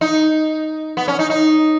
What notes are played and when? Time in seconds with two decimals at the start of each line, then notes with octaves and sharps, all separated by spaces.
0.01 D#4
0.97 B3
1.08 C#4
1.19 D#4
1.30 D#4